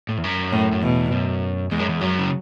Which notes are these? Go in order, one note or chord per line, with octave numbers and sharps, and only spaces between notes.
A2
E2
F#2
A2
F#2
E2 B2
F#2
E2 G#3
F#2
E2
F#2 F#3
C#3